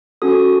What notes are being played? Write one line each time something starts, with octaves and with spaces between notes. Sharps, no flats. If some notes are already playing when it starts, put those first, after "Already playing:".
C#4 F#4 A4 D#6